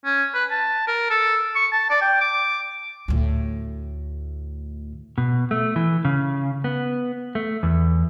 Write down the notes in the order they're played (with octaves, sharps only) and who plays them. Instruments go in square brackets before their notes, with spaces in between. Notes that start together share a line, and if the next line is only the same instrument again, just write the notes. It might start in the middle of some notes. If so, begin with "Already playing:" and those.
[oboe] C#4
B4
A5
A#4
A4
C#6
A5
D5
G5
D6
[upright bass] D2 A2
[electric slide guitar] B2
A3
E3
C#3
B3
A3
E2